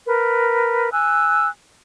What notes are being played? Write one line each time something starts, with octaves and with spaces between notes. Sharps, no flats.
A#4 B4
G#5 E6 F#6